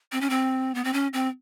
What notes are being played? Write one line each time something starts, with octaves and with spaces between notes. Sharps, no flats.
C4
C#4
C4
B3
C4
C#4
C4